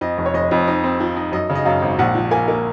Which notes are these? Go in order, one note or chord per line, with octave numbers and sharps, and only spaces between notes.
F2 D#5
F1
C#5
F1 D#5
F2
D#4
C4
F3
D#4
F#2 D#5
C#3
D#5
F#2 F5
G#1
A#1 F#5
F3
A#3 G#5
A#3